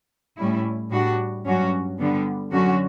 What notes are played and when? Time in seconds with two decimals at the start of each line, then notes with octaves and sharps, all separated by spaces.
0.37 A2 G3 C#4 E4
0.91 A2 G3 D4 F#4
1.45 G2 F#3 C#4 F#4
1.98 D3 G3 B3
2.52 F#2 D3 F#3 C#4 F#4